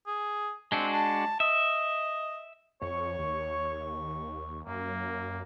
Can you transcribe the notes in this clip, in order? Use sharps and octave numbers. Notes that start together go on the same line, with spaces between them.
G#4
G#3 C4 D4 F#4
A5
D#5 E5
F2 C#5 C#6
D#2
F#2 A#3